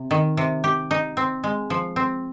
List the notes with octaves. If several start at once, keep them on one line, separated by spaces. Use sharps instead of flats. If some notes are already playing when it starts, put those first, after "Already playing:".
Already playing: C3
D#3
C3
G4
D#4
C4
G#3
F3
C4